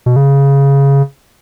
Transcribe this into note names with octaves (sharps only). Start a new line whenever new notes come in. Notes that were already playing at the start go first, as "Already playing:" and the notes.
B2
C#3